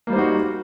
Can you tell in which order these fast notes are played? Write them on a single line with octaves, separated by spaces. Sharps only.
A#3 G3 C5 D#4 F#4